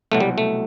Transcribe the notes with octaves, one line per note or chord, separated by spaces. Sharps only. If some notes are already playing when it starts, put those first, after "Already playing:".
C2 B2 F#3 A3
G3
A3